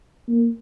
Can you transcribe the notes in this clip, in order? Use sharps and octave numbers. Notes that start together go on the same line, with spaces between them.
A#3